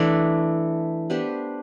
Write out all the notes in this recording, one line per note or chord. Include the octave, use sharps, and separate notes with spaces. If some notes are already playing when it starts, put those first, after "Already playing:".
Already playing: E3 A3 D4 A4
B3 D4 G4 C5